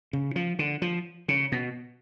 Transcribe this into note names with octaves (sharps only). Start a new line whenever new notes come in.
C#3
F3
D3
F3
C#3
B2